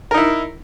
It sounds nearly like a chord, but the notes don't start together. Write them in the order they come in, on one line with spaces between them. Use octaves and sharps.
A#4 D#4 E4